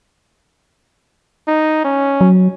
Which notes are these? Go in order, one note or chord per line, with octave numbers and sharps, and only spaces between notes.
D#4
C#4
F#3